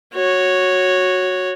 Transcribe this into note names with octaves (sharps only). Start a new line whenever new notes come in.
F#4 C#5